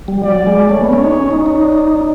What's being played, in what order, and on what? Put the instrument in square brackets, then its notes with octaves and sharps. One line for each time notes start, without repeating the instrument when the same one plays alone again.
[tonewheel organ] G3
[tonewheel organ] F#3 [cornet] D5
[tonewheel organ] G#3
[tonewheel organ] A3 [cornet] C#5
[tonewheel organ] B3
C#4
D#4
C#4
D#4
D#4
[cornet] D5